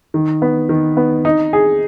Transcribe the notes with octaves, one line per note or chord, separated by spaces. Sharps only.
D#3
B3
D#3
B3
D#4
G#4